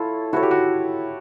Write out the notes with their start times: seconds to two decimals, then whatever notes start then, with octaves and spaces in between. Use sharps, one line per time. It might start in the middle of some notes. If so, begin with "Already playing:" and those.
Already playing: E4 F4 A4 C#5
0.33 E4 F#4 A4 C#5
0.43 G4
0.51 F#4